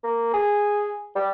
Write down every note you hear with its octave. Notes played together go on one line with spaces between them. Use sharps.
A#3
G#4
G3